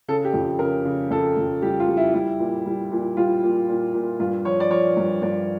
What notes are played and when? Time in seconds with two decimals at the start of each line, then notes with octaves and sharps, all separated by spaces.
0.08 C#3 A4
0.25 G4
0.34 F2
0.59 C#3 A#4
0.85 C#3
1.10 F2 A4
1.37 F2
1.62 G3 G4
1.80 F4
1.88 G3
1.97 E4
2.14 G3 E4
2.39 A#2
2.66 G3
2.91 A#2
3.17 G3 F4
3.43 A#2
3.68 A#2
3.94 A#2
4.20 G2 F4
4.45 F3 C#5
4.60 D5
4.70 F3 C#5
4.97 G2
5.22 G2 D5